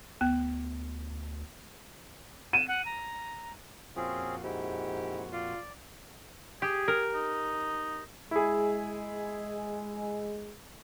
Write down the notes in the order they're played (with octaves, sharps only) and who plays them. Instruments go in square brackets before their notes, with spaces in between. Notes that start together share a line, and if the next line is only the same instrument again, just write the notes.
[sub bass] D2 [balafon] B3
[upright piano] D#7 [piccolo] E7
[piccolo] F#5
A#5
[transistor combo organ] F2 A#2 F#4 [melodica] C4 C#4 G#4 [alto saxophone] F4
[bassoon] G#2 [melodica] E4 [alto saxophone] G4
[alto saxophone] F4 [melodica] D5
[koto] G4 [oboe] G#4
[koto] A#4
[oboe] D#4
[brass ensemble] G#3 [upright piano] E4 G#4